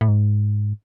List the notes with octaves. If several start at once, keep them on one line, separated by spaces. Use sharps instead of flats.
A2
G#2